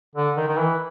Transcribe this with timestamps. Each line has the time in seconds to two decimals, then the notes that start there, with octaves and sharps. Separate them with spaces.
0.16 D3
0.37 D#3
0.48 D#3
0.58 E3